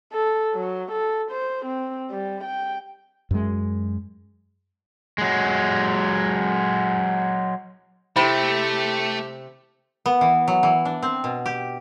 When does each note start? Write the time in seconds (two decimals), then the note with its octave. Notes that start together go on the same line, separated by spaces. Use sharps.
0.12 A4
0.54 F#3
0.92 A4
1.31 C5
1.65 C4
2.11 G3
2.43 G5
3.31 F#2 G#3
5.18 F#3 G#3
8.16 C3 A3 C4 E4 G4 B5
10.06 B3
10.21 E3
10.48 F#3
10.63 E3
10.85 D4
11.02 C4
11.24 B2
11.46 G4